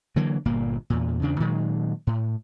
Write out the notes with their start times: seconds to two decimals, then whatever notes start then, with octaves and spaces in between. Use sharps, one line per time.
0.16 D3 E3 F#3 A#3
0.45 G1 A#2 A#3
0.90 E2 A#2
1.22 E2 C#3 D4
1.40 A#2 D#3 F#3 G#3
2.07 A2